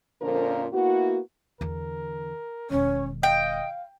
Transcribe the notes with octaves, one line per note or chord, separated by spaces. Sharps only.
F2 A#2 D3 F3 C#4 A#4
A#3 B3 E4 F#4
E2 D3 A#4
E1 D#3 C#4 C#5
D#5 F5 G5